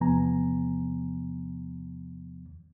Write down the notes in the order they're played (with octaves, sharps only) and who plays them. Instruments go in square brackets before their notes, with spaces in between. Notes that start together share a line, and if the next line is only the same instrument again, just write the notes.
[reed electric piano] E2 C3 F3 B3 G#5 A#5